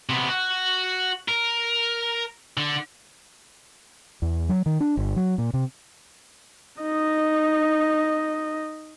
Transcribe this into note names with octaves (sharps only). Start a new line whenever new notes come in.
C3 B3
F#4
A#4
D3
E2
F#3
D#3
D4
G1
F#3
A#2
C3
D#4 D#5